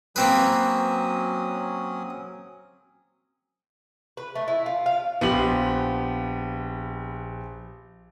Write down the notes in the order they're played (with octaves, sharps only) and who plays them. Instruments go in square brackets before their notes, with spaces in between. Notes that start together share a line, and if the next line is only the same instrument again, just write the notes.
[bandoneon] F#3 C#4 D#6 [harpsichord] A#3 C4 B4
[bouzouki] B4
A3
E4
F4
F5
[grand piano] A#1 G4 F#7 [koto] F3 [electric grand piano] B3